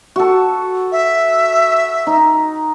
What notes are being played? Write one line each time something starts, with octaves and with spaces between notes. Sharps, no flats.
F#4 A4
E5
D#4